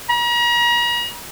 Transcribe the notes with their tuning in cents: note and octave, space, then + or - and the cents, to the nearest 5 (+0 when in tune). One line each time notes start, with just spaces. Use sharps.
A#5 +40